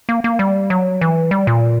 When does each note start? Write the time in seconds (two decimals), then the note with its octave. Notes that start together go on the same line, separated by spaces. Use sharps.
0.09 A#3
0.24 A#3
0.39 G3
0.70 F#3
1.01 E3
1.31 G3
1.47 A#2